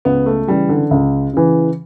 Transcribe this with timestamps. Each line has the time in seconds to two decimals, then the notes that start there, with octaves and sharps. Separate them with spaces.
0.05 C#2 B3
0.26 A3
0.47 C#3 E3 G3
0.69 D3
0.91 C#2
1.33 C#3 E3